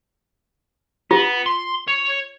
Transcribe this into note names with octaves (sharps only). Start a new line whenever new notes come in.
B3 F4
C6
C#5